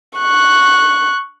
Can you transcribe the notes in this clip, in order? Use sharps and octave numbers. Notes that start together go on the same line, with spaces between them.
C#6 F#6